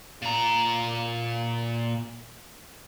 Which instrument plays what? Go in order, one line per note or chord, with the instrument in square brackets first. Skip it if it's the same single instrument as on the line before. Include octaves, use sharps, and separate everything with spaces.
[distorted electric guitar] A#2 A#5